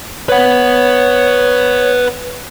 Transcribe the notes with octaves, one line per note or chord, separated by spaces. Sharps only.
B4 C#5 F#5